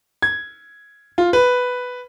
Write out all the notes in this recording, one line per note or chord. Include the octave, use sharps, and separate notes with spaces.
G#6
F4
B4